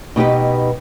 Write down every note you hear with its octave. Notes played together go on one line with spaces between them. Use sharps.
B2 D#4 G4 B4